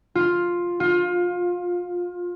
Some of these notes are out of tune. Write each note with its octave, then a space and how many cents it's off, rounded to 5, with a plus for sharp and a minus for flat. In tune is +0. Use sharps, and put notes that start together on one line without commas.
F4 +5
F4 +25